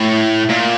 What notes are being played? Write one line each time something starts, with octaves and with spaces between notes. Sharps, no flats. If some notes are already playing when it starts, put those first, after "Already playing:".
Already playing: A2
A#2